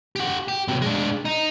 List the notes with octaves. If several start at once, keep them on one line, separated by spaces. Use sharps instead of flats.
G4 F#5
G4
C3 F#3
G#3 D4
D#4